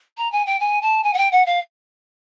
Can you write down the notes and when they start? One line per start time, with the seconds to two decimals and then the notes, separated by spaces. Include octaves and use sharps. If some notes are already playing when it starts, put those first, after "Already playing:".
0.17 A#5
0.32 G#5
0.46 G5
0.60 G#5
0.82 A5
1.04 G#5
1.14 F#5
1.18 G5
1.32 F#5
1.46 F5